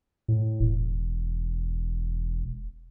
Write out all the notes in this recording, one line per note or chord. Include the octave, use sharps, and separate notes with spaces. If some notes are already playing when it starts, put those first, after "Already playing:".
A2
E1